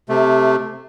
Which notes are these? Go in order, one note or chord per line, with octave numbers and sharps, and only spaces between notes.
C3 A3